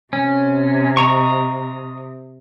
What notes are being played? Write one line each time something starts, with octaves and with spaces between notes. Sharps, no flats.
C3 C#4
D#5 A#5 C#6